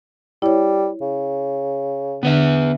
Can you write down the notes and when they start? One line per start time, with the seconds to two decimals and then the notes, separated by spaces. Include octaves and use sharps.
0.42 G3 E4 C#5
1.01 C#3
2.23 D3 B3 D4 B4 E5